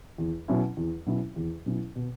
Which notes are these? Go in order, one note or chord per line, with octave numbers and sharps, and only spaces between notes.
E2
B2 F#3 C#4 E4
E2
B2 F#3 C#4 E4
E2
B2 F#3 C#4 E4
B2